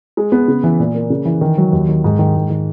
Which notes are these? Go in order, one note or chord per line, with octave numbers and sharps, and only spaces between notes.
G#3
B3
C#3
E3
A#2
A#3
C#3
E3
D#3
F#3
D#2
D#3
G#2
D#3
G#2
D#3